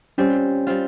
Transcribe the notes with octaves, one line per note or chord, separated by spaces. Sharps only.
G3 C4 C#4 F4
G3 C4 F4